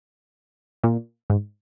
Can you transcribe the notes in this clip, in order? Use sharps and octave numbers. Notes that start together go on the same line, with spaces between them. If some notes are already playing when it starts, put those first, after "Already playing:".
A#2
G#2